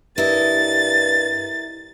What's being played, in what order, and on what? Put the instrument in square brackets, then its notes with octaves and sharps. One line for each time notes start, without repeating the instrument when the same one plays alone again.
[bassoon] G2 [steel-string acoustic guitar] E4 A#4 D#5 [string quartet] A6